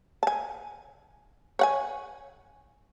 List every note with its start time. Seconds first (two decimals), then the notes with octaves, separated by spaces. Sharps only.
0.23 G#5 A5
1.59 C#5 F#5 G#5